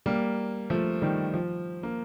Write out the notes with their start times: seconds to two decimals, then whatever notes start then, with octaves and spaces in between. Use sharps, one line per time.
0.06 G3 A#3
0.70 F3 A3
1.02 D#3 G3
1.34 F3
1.83 A#3